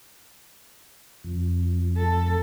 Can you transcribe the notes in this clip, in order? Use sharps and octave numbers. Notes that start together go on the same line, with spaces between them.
F2
A4